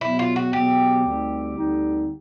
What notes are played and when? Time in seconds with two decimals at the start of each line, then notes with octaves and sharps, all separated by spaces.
0.01 E2 B2 F#3 B3 E4
0.19 F4
0.36 F#4
0.53 E2 B2 F#3 B3 G4
1.04 D2 D3 G3 C4 D#4
1.57 D2 D3 G3 C4 D#4